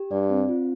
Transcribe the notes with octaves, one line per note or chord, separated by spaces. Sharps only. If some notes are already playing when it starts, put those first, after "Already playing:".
Already playing: G4
G2 D5
C4
F4